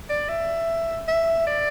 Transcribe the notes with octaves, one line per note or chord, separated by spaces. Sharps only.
D5
E5
E5
D5